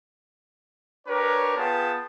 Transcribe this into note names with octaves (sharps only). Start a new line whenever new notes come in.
D4 G4 A#4 B4 C#5
B3 F4 G#4 B4 G5 A5